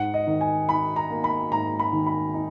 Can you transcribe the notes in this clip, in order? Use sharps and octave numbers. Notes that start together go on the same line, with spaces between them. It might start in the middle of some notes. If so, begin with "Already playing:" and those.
Already playing: G#2 F#5
D#5
D#3
G#5
D#4 B5
A#5
A#3
B5
G#2 A#5
B5
D#3
B5
D#4